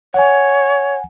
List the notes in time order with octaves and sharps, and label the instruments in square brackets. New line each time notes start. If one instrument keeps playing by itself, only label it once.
[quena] C#5 [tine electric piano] F#5 G#5